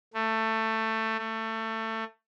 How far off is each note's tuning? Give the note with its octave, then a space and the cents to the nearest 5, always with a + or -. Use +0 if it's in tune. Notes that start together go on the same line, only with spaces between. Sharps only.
A3 +15
A3 +20